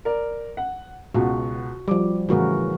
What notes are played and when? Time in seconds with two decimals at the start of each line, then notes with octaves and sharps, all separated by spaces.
0.05 A#4 D5
0.57 F#5
1.14 C#2 B2 F#4
1.88 F3 G3 D6
2.29 A2 C#3 E3 F#4 A#4